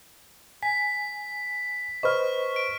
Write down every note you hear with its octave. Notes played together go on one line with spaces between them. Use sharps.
G#5 B6
B4 C5 D#5 C#6 F6
D7